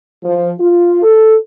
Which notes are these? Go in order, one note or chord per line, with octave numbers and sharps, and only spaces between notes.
F3
F4
A4